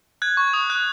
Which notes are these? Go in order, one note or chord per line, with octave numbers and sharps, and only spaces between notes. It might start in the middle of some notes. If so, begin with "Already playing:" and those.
F#6 G#6
C#6
D#6
F#6